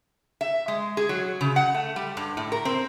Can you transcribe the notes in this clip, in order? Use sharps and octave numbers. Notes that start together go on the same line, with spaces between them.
E5
G#3
G#4
F#3
C#3
F#5
A3
G3
G2
A2
A#4
C4